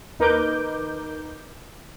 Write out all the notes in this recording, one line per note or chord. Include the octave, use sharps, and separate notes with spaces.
D#2 D#4 A#4 B4 D6 G6